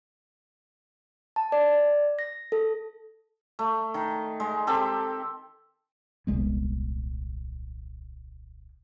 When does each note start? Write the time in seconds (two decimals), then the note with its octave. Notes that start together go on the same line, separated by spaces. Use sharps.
1.36 A5
1.52 D5
2.19 A#6
2.52 A4
3.59 A3
3.94 D#3
4.40 G#3
4.67 C4 G4 A4
6.27 D#1 C2 G#3 B3